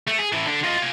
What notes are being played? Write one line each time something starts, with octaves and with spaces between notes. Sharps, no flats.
A3
G#4
A2 E3
D3
F4 D#5
F4 G#5